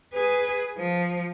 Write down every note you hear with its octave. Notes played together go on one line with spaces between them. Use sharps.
G#4 B4
F3